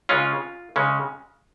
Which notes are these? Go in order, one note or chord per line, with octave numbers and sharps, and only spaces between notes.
C#3 G#3 C#4 F4
C#3 G#3 C#4